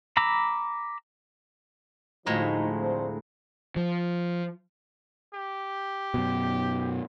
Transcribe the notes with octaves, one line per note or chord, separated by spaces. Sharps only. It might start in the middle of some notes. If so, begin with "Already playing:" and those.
A#5 B5 D6 E6
D2 A2 F3 G#3 D#4 A#5
C4 D4 C5
F3
G4
F#2 B2